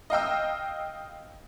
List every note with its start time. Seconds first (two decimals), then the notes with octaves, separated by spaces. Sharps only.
0.10 D#5 F5 G5 E6